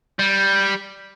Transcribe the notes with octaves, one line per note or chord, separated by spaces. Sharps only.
G3